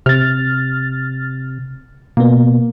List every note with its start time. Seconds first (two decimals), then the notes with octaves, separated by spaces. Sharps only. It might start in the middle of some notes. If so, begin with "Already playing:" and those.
0.06 C3 F6 A6
2.17 B2 A#3 B3